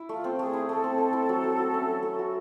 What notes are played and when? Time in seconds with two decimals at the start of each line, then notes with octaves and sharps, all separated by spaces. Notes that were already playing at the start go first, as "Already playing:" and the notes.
Already playing: E4
0.09 A3 F4
0.24 C4
0.39 A3 G#4
0.53 E4
0.69 A3 A4
0.84 C4
0.98 A3
1.13 E4
1.29 F#3
1.44 A3
1.58 F#4
1.74 C#4
1.88 F#3
2.03 A3
2.19 F#4